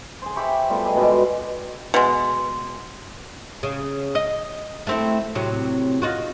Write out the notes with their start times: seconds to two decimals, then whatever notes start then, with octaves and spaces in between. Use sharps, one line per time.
0.22 G#4 C5
0.36 G4 E5 B5 C#6
0.70 G3 A3 B3 F4
0.83 G4 G#4 D#5
0.96 G#2 B2 D3
1.11 C5 F#5
1.94 B2 G#3
3.63 C#3
4.15 D#5
4.87 A3 C4 E4
5.35 A2 C3 F#3
6.02 D#4 F4 F#4